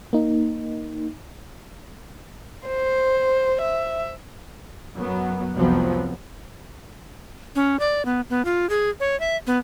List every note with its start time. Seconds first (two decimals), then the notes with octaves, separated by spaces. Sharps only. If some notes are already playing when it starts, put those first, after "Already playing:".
0.13 A#3 D#4
2.67 C5
3.61 E5
4.97 F#2 F#3 B3
5.55 F1 C2 F3 F#3 B3 C4
7.55 C#4
7.80 D5
8.05 B3
8.30 B3
8.45 F4
8.70 G#4
9.00 C#5
9.20 E5
9.47 B3